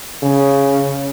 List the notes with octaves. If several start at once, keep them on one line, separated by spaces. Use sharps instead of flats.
C#3